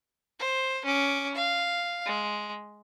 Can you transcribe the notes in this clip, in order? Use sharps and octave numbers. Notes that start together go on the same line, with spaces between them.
C5
C#4 D6
F5
G#3